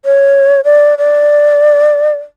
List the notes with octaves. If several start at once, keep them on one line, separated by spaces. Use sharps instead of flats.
C#5
D5
D5